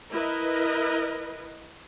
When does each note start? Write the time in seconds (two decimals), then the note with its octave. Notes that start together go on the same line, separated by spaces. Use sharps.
0.10 E4 A#4 B4 D#5